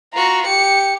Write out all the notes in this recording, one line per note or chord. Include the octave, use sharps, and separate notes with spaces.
F4 F#4 A#5
G4 C#7